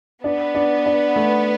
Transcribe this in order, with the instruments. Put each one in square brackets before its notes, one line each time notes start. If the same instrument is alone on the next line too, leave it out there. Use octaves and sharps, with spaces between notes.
[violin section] B3 [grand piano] D4
[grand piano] D4
D4
A3